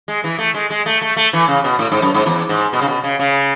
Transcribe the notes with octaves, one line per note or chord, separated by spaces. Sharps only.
G#3
E3
A3
G#3
G#3
A3
A3
A3
E3
C#3
B2
A2
G#2
F#2
G#2
E2
G#2
B2
C#3
B2
C#3
C#3